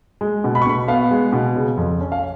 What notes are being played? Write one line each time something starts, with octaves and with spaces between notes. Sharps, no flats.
G#3
B2
B5
C#6
B2 B5
B3 F5
G#3
B2
C#3
F2
C#4
F5